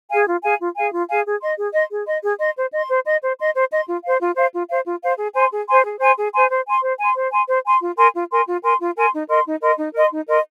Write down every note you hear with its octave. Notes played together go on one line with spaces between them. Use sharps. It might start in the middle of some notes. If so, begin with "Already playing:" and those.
G#4 F5 G#5
F4
G#4 F5 G#5
F4
G#4 F5 G#5
F4
G#4 F5 G#5
G#4
D#5 C6
G#4
D#5 C6
G#4
D#5 C6
G#4
D#5 C6
C5
D#5 C6
C5
D#5 C6
C5
D#5 C6
C5
D#5 C6
F4
C5 F5
F4
C5 F5
F4
C5 F5
F4
C5 F5
G#4
C5 G#5 C6
G#4
C5 G#5 C6
G#4
C5 G#5 C6
G#4
C5 G#5 C6
C5
G#5 C6
C5
G#5 C6
C5
G#5 C6
C5
G#5 C6
F4
A#4 G#5 C6
F4
A#4 G#5 C6
F4
A#4 G#5 C6
F4
A#4 G#5 C6
D#4
A#4 D#5 C6
D#4
A#4 D#5 C6
D#4
A#4 D#5 C6
D#4
A#4 D#5 C6